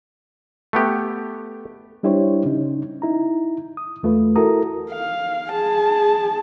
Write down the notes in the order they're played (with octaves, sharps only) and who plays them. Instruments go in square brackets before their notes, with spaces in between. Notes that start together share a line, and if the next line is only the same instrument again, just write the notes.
[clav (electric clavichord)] A3 B3 G4
[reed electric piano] G3 D4 E4 G4 C5 C#5
C#3 C#4 D#4
D#4 E4 A#5
D#6
E2 A3 F4 B4
E4 F#4 A4 A#4 A#5 D#6
[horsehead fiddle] F5
G#4 A5